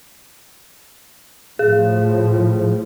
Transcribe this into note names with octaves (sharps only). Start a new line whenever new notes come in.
A2 F3 G#4